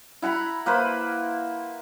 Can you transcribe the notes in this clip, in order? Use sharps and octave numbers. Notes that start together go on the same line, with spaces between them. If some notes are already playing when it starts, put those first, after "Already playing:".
E4 F#5 A#5 B5
A#3 B4 C5 B5